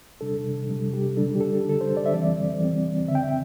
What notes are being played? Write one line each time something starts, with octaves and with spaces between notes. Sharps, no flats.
C3 G3 D4 A4
C3 G3 D4
G4
D3 G3 D4 A4
G4
A4
D3 G3 D4 A4
C5
D5
E5
E3 G3 C4 D5
E3 G3 C4
D3 C4 E5
G5
E5